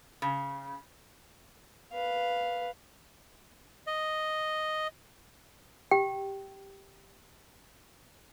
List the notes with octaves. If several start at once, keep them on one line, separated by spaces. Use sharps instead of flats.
C#3
B4 F5
D#5
G4 G5